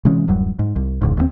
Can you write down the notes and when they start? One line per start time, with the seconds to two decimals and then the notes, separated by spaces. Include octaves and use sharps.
0.05 C3 E3 G#3 C#4
0.28 D1 F#2 F#3 G3
0.59 G#2
0.76 C2
1.01 E1 C#2 G#2
1.17 D#2 E3 C4